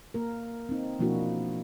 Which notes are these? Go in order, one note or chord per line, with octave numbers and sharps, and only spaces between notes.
A#3 A#4
C4 D#4
B2 F3 A#3 D4 E4 F#4